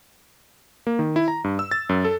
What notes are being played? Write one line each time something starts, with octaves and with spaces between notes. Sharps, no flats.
A#3
D#3
E4
A#5
G2
E6
A6
F#2
A4